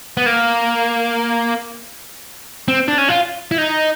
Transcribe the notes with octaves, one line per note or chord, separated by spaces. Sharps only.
B3
A#3
C4
D4
C#4
F4
E4
D#4